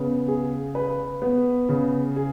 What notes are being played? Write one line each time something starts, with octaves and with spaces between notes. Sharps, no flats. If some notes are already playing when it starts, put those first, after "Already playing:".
Already playing: C#3 B3
G#4
B4
B3
C#3
G#4